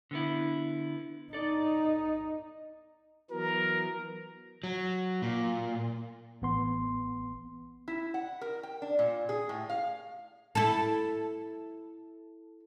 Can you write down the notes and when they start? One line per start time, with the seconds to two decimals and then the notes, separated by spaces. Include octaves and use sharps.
0.11 D3 B3 E4
1.33 D#4 A4 D5
3.31 E3 F#3 B3 A#4
4.64 F#3
5.22 A#2
6.42 A1 B3 C6
7.88 E4
8.14 F#5
8.41 A#4
8.63 G5
8.82 D4
8.99 A#2
9.29 G#4
9.49 A2
9.70 F5
10.55 E4 A4